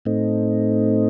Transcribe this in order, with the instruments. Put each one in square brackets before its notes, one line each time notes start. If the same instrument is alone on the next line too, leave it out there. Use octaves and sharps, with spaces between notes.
[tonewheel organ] A2 A3 C4 D#4